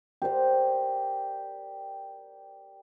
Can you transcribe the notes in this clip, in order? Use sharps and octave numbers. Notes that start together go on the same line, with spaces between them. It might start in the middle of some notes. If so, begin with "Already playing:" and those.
G4 A#4 C5 D5